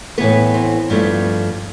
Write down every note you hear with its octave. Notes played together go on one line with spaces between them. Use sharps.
A2 E3 B3 B4
C4
G2 F3 A3 B3